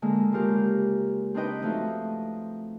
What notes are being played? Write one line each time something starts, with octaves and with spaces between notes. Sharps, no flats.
D3 G#3 A#3
C#3 G#3 F4 G4 A#4
C4 D4 D#4 B4 D#5 G5
F3 A3 D#4 F#4